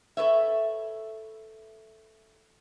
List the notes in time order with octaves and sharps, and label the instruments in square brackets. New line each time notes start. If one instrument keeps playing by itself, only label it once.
[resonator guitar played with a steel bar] A4 B4 C#5 E5